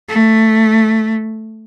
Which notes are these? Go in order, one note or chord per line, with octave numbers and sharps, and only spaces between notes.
A3